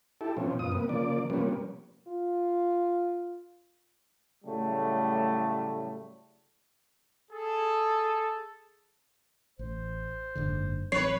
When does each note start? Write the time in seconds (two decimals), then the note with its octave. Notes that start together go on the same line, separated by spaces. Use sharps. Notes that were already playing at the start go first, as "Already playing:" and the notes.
0.21 E4 G4 A4
0.37 B2 F3 C4 C#4
0.59 F#2 B2 F4 D#6
0.72 C3 A#3 B3
0.89 C#3 F3 A#3 D5
1.30 C3 F3 G3 A#3 B3 C#4
2.07 F4
4.45 A2 C#3 F#3 G3 A3
7.32 G#4 A4
9.59 A1 C5
10.35 F#1 G#2 D3
10.92 A1 F#3 C4 B4 C#5 C7